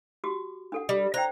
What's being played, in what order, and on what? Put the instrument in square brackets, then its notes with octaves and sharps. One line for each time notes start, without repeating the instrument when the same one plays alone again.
[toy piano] F#4 G4 D6
D4 A4 F#5
[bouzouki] G3
[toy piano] C5 D5 G5 [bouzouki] A#5